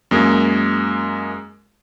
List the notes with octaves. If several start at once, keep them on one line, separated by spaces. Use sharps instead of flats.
F#2 G#3 A#3